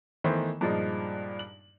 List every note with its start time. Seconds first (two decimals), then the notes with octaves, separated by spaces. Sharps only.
0.24 D#3 E3 A3 B3 C5
0.61 G2 A#2 F3 G#3 D4 D#4
1.39 F#7